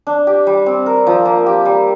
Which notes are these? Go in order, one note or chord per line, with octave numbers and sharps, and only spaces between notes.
D4
G4
G3
C4
A#4
F3
A#3
G4
G3